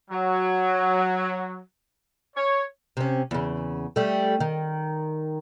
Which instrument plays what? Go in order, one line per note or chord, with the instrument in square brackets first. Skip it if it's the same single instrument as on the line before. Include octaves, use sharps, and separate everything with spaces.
[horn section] F#3
C#5
[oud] C3 C#4
E2 C#3
G3 A3
D#3